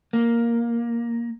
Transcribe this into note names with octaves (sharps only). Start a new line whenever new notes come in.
A#3